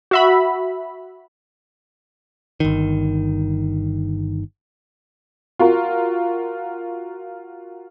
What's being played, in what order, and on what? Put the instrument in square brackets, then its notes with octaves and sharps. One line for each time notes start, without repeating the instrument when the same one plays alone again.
[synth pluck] F#4 E5 B5
[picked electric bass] G1 D#3
[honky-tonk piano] F4 F#4 A#4